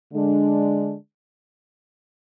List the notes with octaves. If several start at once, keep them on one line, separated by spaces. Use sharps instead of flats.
D3 G#3 D4